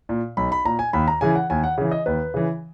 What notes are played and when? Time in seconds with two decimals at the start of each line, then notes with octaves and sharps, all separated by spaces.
0.09 A#2
0.37 B1 B5
0.52 B5
0.65 A#2 A#5
0.79 G#5
0.93 D#2 B5
1.08 A#5
1.21 C#3 E3 G#5
1.35 F#5
1.50 D#2 G#5
1.64 F#5
1.78 C#3 E3
1.92 D#5
2.06 D#2 B4
2.34 C#3 E3